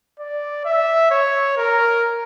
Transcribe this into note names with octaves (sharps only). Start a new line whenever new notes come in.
D5
E5
C#5
A#4